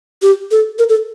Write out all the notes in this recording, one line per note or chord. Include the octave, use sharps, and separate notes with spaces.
G4
A4
A#4
A4